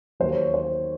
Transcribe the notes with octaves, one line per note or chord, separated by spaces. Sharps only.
D#2 D#3 F#3 C5
C#5
C#5
C5